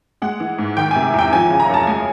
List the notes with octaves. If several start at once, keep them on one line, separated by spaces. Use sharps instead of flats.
G#3 F#5
E3
G#2
D#3 G5
C3 G#5
E2 G5
F3 G#5
C#3
A#5
F#2 A5
G#3 G#5